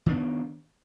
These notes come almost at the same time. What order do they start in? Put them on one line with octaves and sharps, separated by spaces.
D#3 D4 B3